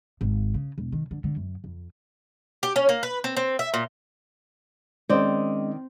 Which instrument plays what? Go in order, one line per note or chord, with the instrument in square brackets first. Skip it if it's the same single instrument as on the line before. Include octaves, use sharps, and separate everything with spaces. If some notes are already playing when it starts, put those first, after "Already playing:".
[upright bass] G#1
C#3
E1
D#3
D3
D3
F#2
F2
[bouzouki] G4
C#4
A#3
B4
C4
C4
E5
A#2
[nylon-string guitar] D#3 D5 [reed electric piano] G#3 C#4 D#5 [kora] C4